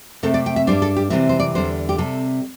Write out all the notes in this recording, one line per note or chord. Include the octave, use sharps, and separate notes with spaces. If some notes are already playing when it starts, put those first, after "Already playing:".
C3 A3 C4 A4
D5
G5
E5
G2 G3 D4 C5
A4
G4
C3 E3 G3 C4 E5
C5
D5
E2 D3 G3 C5
G4
C3 G3 C4 A4